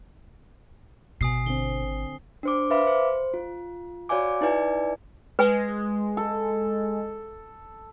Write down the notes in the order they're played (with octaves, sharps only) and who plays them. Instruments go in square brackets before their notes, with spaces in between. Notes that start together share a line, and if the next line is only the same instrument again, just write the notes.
[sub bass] G#1 [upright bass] B2 [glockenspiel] G#5 D#6 C7
[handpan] D3 C4 [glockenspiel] G7
[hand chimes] D4 C5 D6
B4 C5 E5 F5 B5 D6
C5
F4
F#4 C#5 D5 F5 G#5 D6
D#4 E4 B4 D5 G#5
[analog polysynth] G#3 [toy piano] B4 G#5
[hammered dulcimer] A4